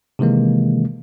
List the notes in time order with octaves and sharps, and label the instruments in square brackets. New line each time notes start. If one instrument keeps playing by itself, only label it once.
[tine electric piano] C3 D#3 E3 G#3 A#3